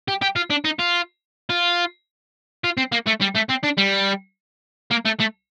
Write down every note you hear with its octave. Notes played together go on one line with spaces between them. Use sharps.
G4
G4
F4
D4
D#4
F4
F4
F4
C4
A#3
A3
G3
A3
C4
D4
G3
A#3
A3
A3